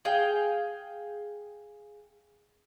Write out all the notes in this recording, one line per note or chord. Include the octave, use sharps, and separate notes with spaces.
G#4 F5 G5